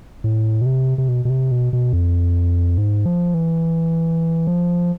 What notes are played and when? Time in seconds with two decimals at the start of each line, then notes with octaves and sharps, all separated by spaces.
0.24 A2
0.61 B2
0.66 C3
0.98 C3
1.08 B2
1.25 B2
1.30 C3
1.51 B2
1.73 B2
1.93 F2
2.78 G#2
3.06 F3
3.34 E3
4.47 F3